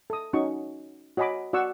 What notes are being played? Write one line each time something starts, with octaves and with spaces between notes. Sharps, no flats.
A4 D#6
C#4 D#4 F#4 C#6
F#4 C#5 D#5 G#5 B5 D6
F#4 D5 F#5 C#6 E6